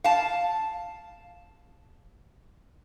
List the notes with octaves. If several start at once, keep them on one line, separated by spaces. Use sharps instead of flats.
F5 A5